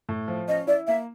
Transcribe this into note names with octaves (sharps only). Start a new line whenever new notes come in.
A2
F3
C#4 D#5
E4 D5
A#3 E5